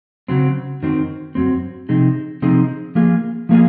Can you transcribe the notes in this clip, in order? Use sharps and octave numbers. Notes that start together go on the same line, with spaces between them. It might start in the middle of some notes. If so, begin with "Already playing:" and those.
C#3 F#3 C4
F#2 D#3 F#3 C4
F#2 D#3 F#3 C4
C3 F3 C4 D#4 G#4
C3 F3 C4 D#4 G#4
F3 A#3 F4 G#4
F3 A#3 F4 G#4